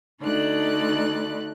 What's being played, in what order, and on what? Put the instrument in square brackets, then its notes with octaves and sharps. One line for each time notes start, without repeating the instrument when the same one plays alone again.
[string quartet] D2 D4 D#4 A4 D5 F#6